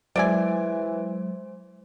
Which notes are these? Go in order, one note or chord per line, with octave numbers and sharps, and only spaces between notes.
E3 F#3 G#3 C5 D5 E5 G#5